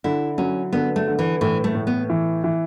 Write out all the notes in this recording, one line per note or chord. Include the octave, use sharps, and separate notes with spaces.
D3 E4
F#3 C#4
D3 B3
A3
D3
E3
A2 E3
A3
A2
B3
E3
E3